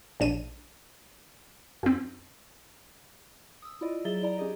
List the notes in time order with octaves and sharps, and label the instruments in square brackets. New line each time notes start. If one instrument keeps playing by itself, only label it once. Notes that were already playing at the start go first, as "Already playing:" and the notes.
[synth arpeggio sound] A#1 D4 D#7
F#2 C4
[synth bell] D#6 E6
E4 F4 D5 D#5
F#3 G#4 E5 A#5 A6 G7
E4 D5 A#5
C#4 G4 G#4 D#5